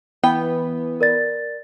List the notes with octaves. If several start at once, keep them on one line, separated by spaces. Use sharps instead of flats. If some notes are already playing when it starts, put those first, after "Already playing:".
E3 B3 G5
A#4 D5 A6